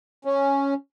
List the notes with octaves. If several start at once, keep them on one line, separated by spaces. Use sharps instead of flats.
C#4